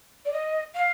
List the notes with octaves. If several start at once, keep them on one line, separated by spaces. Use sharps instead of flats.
D5
D#5
F5